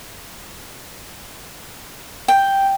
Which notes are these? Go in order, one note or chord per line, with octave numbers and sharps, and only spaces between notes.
G5